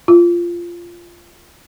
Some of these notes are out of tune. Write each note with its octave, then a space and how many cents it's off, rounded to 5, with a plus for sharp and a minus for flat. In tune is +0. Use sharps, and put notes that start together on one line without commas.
F4 -15